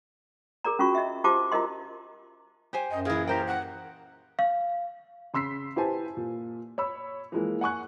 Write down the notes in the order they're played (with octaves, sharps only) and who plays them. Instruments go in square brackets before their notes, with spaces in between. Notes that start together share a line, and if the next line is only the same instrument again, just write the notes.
[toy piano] G#4 A#4 D5 A#5
C#4 F4 F#4 C#6
D#5 E5
F4 G4 C5 A5 D6
E4 F4 A#4 D#5 C6
[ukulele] G4 C5 G#5
[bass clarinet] F#2 [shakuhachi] D#5
[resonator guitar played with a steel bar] A#2 E3 [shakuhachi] G#4
[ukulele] G4 C5 G5 [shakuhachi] A#4
[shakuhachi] F#5
[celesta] F5
[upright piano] C#3 C6 E6 B6 C7
E4 G4 B4 C5 G#5 A5
A#2
C#5 B5 E6
E3 F3 G#3 A#3
F#5 G#5 C#6 F#6